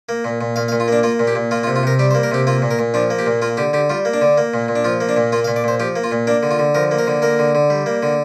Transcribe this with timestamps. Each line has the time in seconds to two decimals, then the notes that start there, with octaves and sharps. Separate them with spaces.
0.09 A#3
0.24 A#2
0.41 A#2
0.56 A#2 F5
0.68 F5
0.72 A#2
0.80 F4
0.88 A#3 D4
1.03 A#3 F4
1.19 A#2
1.27 G4
1.35 A#2
1.51 A#3 F4
1.63 F4
1.67 C3
1.76 F4
1.83 C3 A#4
1.99 G3 G4
2.11 C5
2.14 A#3
2.23 A#4
2.31 C3 G4
2.47 A#3 F4
2.62 A#2
2.71 A#4
2.79 A#2
2.94 F3 D4
3.10 A#3
3.19 G4
3.26 A#2
3.42 A#3 F4
3.57 D3 G4
3.73 D3 G4
3.90 G3 F4
4.05 A#3
4.13 D4
4.21 D3
4.38 A#3
4.54 A#2
4.68 A#2
4.76 D4
4.85 F3 F4
5.01 A#3
5.09 D4
5.17 A#2
5.32 A#3 F4
5.44 F5
5.48 A#2
5.56 D5
5.64 A#2 C5
5.80 F3 G4
5.96 A#3
6.04 F4
6.12 A#2
6.27 A#3 D4
6.43 D3
6.51 F4
6.59 D3
6.75 F3 A#4
6.91 A#3
6.99 A#4
7.07 D3
7.22 A#3 A#4
7.39 D3
7.55 D3
7.70 G3
7.86 A#3
8.03 D3